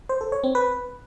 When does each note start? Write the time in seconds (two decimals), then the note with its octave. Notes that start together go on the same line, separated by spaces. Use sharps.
0.09 C5
0.21 A4
0.32 C#5
0.44 C4
0.55 B4